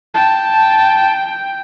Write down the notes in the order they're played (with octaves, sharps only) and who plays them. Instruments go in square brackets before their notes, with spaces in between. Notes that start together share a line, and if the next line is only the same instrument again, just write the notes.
[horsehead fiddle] G5 [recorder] A5